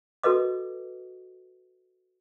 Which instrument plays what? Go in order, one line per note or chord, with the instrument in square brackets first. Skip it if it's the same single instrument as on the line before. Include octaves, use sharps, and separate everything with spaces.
[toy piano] F#4 A4 B4 D#5 D6